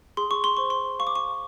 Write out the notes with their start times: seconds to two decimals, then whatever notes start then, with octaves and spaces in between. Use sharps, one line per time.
0.17 G#4 C6
0.31 C#6
0.44 C6
0.57 C5 C#6
0.70 C6
0.99 F5 C#6
1.07 D6
1.15 C#6